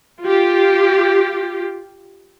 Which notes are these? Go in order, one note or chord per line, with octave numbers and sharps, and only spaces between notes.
F4 G4